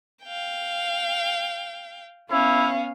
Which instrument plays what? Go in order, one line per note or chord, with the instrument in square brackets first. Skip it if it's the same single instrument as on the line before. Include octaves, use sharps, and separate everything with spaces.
[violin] F5 G5
[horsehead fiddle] B3 F5 [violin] C#4 [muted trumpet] E4